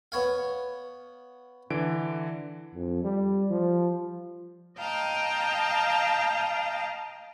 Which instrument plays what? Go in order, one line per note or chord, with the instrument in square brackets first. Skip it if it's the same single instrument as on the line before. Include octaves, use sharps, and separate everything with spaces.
[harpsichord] B3 C#5 F5
[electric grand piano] D3 E3 D7
[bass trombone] F2
G3
F3
[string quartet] D#5 F5 G5 A5 A#5